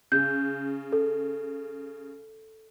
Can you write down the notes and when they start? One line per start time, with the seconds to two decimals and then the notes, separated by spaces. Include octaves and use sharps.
0.12 C#3 G6
0.92 A4